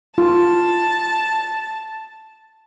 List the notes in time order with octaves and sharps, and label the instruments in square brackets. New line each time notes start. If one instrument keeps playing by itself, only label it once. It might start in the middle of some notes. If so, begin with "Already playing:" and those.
[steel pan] F4 [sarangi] A5